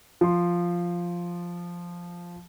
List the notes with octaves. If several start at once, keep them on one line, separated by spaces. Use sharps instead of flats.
F3 C6